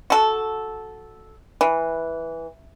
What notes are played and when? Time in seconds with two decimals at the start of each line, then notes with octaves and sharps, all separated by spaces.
0.10 F#4 A4
1.61 E3